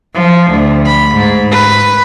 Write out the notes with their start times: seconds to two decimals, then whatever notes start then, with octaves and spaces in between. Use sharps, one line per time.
0.13 F3
0.50 D2
0.86 B5
1.15 G#2
1.52 B4